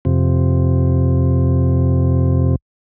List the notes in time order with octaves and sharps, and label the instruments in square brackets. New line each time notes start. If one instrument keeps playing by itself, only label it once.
[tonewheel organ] F2 C3